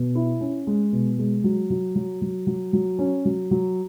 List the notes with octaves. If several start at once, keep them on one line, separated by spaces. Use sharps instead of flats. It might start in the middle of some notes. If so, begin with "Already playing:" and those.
Already playing: B2
E4
C#4
G#3
B2
G#3
F#3
F#3
F#3
F#3
F#3
F#3
C#4
F#3
F#3